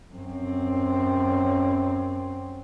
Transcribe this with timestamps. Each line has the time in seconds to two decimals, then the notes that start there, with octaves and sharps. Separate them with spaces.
0.13 F#2 C4